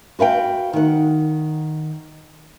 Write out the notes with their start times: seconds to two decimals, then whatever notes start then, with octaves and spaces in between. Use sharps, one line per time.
0.19 F#4 B4 F5 G5
0.73 D#3 F#5